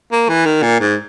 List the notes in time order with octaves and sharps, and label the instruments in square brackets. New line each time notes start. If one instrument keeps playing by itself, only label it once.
[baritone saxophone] A#3
E3
D#3
A#2
G#2